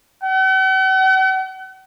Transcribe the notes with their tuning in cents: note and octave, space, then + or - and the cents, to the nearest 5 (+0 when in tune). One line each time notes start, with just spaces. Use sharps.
F#5 +45